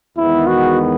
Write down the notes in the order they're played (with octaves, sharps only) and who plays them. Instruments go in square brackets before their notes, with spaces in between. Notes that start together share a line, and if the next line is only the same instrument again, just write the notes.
[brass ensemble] E2 D#3 G#3 B3 [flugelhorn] E4
[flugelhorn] F#4